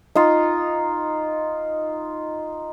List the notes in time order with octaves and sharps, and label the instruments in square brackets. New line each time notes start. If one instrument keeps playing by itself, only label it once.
[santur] D#4 F4